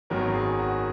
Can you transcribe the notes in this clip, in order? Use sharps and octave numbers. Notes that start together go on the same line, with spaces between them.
G#1 F#2 D#3 F#3 B3 A#4
G#4
F#4